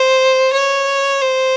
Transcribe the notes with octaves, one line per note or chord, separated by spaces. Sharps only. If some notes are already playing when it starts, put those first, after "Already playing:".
Already playing: C5
C#5
C5